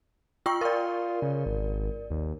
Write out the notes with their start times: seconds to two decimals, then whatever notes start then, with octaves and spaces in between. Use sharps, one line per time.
0.46 F4 G5 C#6
0.61 F4 A#4 D5
1.22 C#3
1.46 G#1
2.10 D#2